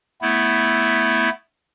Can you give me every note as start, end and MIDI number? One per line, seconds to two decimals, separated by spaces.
0.22 1.29 57
0.22 1.29 59
0.22 1.29 64